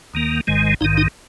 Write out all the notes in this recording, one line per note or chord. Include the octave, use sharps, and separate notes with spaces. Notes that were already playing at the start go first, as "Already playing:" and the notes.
D#2 D#3 A#3
G#1 G#2 D#3 G#3
A#1 G#2 D#3 D#4
D#4